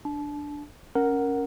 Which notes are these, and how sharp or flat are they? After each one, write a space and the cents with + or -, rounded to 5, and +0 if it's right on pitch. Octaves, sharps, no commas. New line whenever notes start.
D4 +0 A5 -30
C#4 +0 A#4 +0 F#5 +0